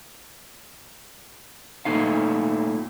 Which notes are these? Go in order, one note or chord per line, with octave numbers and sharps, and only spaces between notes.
A#2 A3 D#4 F5